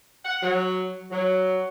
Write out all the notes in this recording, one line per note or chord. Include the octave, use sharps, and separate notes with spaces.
F#5
F#3
F#3